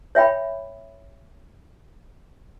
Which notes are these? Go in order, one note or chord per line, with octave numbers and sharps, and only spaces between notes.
C#5 E5 G5 B5